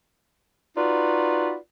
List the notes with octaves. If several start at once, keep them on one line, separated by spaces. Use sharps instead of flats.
D#4 F4 F#4 B4 D5